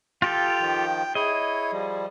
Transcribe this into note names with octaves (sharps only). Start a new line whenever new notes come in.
F4 G4 A4 G5
D#3 F3
E4 G#4 C#5 D#5
G#4
F3 G3